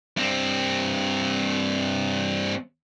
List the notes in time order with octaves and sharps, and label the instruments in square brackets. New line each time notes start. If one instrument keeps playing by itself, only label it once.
[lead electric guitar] G2 C4